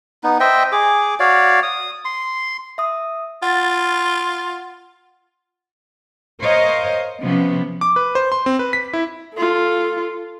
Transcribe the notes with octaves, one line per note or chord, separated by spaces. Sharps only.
B3 D#4
C5 D#5 E5 G5
G#4 D6
F#4 C#5 D5 F5
D#6
C6
E5 D#6
F4 F#5 A6
A#4 C5 C#5 D#5 F5
C3 F3 B3 C#4
D6
B4
C5
C6
C4
B4
B6
E4
F4 A4